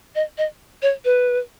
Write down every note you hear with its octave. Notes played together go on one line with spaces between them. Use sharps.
D#5
D#5
C#5
B4